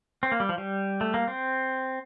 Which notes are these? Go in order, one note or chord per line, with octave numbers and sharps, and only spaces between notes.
C4
A#3
G3
F3
G3
A3
A#3
C4